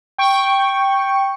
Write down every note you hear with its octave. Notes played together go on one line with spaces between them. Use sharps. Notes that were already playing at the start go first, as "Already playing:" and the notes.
G5 C#6